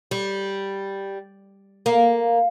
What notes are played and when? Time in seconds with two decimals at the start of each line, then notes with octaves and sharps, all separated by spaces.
0.11 G3
1.86 A#3